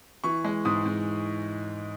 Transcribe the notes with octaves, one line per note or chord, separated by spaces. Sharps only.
E3 C#6
G#3
G#2 D#6
G#2